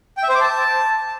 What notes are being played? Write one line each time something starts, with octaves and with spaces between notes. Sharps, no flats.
G5
E5
C5
D6
A5